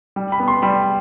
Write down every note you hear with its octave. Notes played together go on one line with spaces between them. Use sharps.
G3
B5
B3
C6
G3 B5